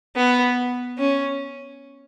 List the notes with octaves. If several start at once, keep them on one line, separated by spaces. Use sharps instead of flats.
B3
C#4